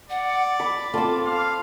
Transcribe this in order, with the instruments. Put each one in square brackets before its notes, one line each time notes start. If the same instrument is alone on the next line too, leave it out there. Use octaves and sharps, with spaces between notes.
[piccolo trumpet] D5 [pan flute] F#5
[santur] B5 [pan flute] D6
[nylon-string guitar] C4 F4 [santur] A4 B5
[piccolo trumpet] F5